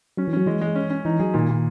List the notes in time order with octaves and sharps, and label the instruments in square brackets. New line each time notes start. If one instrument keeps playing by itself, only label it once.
[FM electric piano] F#3 [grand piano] C#4
[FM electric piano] E3
[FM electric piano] F#3 [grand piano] C#4
[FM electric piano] E3 [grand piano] G#3
[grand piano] G#3
C#4
C#4
[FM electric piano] E3 [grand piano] D#4
[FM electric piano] F#3 [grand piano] G#4
[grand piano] A#2 [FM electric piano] D#3
[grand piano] A#2